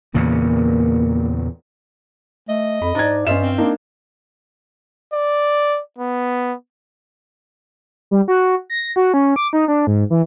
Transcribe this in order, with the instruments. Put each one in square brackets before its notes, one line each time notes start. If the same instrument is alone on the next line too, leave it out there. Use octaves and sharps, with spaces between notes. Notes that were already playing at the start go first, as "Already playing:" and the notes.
[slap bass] E2 A#2 C#3 [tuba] A#3
[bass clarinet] A3 [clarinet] D#5
[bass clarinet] F2 [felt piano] B5
[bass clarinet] G#2 [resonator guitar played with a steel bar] D4 [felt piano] A#5 G#6
[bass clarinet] G2 [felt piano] C#4 D#5 E7 [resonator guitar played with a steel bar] F4 C5 E5
[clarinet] C4
[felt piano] A#3 D4 D#4
[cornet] D5
B3
[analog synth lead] G3
F#4
A#6
F#4
C#4
D6
D#4
D4
G#2
E3